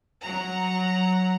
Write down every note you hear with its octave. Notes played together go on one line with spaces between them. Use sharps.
F#3 F#5 A#5